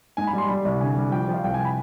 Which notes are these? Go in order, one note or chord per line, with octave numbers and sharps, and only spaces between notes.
G#2 G#5
B5
G3 C6
G3 B5
C2
D3 G#5
G3
F3 G5
G5
F3
F5
C2 G5
G#5
B5